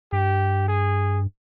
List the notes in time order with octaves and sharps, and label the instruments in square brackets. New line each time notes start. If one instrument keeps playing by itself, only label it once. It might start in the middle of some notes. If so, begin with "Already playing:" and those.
[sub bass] G2 [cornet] G4
[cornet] G#4